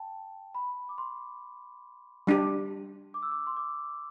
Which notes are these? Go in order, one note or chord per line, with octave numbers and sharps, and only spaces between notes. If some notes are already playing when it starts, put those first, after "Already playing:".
Already playing: G5 A5
B5
D6
C6
G3 D4 G4
D6
E6
D6
C6
D6